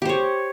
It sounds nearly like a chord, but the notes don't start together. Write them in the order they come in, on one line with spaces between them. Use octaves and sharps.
G4 C5 C#5